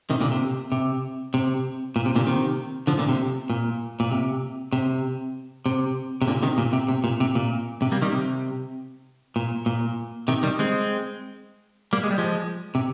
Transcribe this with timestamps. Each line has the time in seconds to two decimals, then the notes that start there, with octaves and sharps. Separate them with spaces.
0.10 C3 D#3
0.21 A#2 D3
0.31 C3
0.72 C3
1.34 C3
1.96 A#2
2.05 C3
2.16 A#2 D3
2.26 C3 D#3
2.87 D3 F3
2.98 A#2 D3
3.09 C3
3.50 A#2
4.00 A#2
4.11 C3
4.73 C3
5.66 C3
6.22 C3
6.27 A#2 D3
6.43 C3 D#3
6.58 A#2
6.73 C3
6.88 C3
7.04 A#2
7.20 C3
7.35 A#2
7.82 C3
7.92 G3 A#3
8.02 D#3 G3
8.12 C3
9.36 A#2
9.66 A#2
10.28 C3 D#3
10.43 D#3 G3
10.59 G#3 C4
11.93 G3 A#3
12.03 G#3
12.11 G3
12.18 F3 G#3
12.75 C3